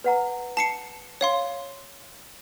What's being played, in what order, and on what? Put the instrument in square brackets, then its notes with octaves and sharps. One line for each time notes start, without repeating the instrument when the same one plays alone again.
[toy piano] B4 F#5 A#5
[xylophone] A5 C7 C#7
C#5 F5 C6